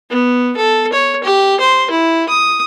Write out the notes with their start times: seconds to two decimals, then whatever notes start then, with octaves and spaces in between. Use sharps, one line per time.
0.10 B3
0.57 A4
0.93 C#5
1.24 G4
1.60 C5
1.90 E4
2.29 D#6